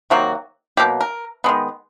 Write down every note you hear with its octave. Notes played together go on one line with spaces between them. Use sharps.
C3 D#3 F#3 A#3 F#4
B2 F#3 A#3 G4
A#4
D#3 G#3 B3